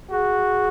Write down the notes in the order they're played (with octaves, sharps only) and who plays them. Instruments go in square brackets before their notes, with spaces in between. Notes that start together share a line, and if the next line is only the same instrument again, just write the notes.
[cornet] F#4 [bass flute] G#4